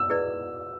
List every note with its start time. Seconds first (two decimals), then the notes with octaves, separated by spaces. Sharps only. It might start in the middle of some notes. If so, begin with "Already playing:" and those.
Already playing: E6
0.10 E4 G#4 B4 D5